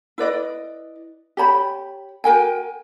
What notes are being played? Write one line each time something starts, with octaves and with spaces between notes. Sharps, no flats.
E4 B4 D5 D#5
G4 C#5 A5 B5
F#4 A#4 G5 G#5